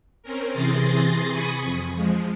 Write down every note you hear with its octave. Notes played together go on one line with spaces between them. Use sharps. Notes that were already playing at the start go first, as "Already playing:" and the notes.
C4 C#4 A#4
C3 E3 G#4 C6 A6 A#6
G#5 B5 C#6 D#6
F2
F3 G#3